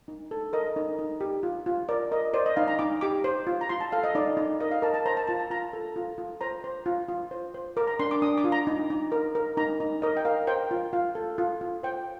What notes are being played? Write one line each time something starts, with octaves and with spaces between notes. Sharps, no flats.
D#4
A4
A#4 D#5
D#4
D#4
G4
F4
F4
A#4 D5
A#4 D#5
C5 D5
D#5
D#4 F5
A#5
D#4 D6
G4 D6
C5
F4
A#5
F4 C6
A5
A4 F5
D#5
D#4 D5
D#4
A#4 D#5
F5
A#4 A5
A5
C5 A#5
A5
F4 A5
A5
F4 A#5
A4
F4
F4
C5 A#5
C5
F4
F4
C5
C5
A#4 D6
A#5
D4 C6
D6
D4 D#6
D6
F4
A#5
D#4
D#4
A#4
A#4
D#4 A#5
D#4
A#4 D#5
G5
A#4 F5
C5 G5
F4
F4 F5
A4
F4
F4
C5 G5